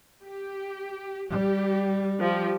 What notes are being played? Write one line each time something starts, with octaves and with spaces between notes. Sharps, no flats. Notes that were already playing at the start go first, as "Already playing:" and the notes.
G4
G3 G4
F3 G4